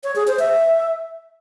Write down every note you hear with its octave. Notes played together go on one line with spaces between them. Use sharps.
C#5
G#4
C5
E5